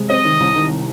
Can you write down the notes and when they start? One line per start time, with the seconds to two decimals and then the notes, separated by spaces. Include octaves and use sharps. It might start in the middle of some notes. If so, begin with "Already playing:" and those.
Already playing: C3 G#3
0.10 C4 D#5
0.25 D#3
0.40 C2
0.56 D#3